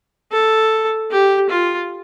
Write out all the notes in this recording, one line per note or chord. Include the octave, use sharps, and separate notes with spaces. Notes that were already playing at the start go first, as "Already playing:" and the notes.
A4
G4
F4